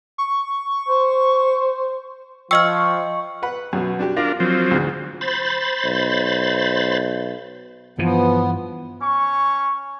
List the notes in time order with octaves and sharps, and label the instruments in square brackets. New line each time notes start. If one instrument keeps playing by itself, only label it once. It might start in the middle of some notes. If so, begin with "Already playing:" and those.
[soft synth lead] C#6
[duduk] C5
[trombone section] F3 [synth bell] D#5 G5 [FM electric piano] C#6 [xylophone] E6 F6
[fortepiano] B4 F#5 B5
F#2 B2
D4 F#4 G4
[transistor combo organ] D4 A#4 [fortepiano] F4
[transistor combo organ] F3 F#3 C4
[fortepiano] D2 G#2
[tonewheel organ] C5 B5 A6
[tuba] B1
[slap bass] G2 E3 [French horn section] F3 [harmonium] B3
[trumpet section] C#4 C#6